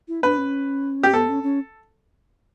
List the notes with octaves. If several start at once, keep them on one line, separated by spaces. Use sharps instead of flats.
E4
D4 B4
C#4
G4
B3 A4
C#4
C#4